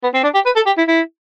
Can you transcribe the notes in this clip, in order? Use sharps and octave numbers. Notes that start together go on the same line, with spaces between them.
B3
C4
D4
G4
B4
A4
G4
E4
E4